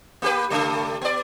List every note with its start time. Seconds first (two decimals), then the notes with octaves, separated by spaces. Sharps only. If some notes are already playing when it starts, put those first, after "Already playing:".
0.22 A#3 G4 B4
0.50 G2 C#3 A3
1.01 B3 D5